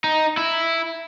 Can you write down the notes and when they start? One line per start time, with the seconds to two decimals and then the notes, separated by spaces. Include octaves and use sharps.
0.04 D#4
0.37 E4